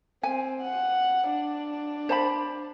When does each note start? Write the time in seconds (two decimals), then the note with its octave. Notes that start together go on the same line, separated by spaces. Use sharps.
0.23 C4 G#5
0.63 F#5
1.30 D4
2.09 C5 A5 B5